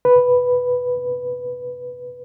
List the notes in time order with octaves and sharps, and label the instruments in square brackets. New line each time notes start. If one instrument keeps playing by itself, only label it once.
[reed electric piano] B4